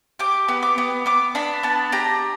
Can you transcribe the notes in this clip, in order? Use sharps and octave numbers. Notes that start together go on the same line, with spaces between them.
G4 D6
B3
D6
B3
B3 D6
D4 B5
B3 A5
G4 A#5